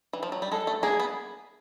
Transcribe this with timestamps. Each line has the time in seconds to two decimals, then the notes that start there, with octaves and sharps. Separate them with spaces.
0.13 E3
0.23 F3
0.32 F#3
0.42 G3
0.52 G#3 A4
0.67 A3
0.83 A#3 G#4
1.00 B3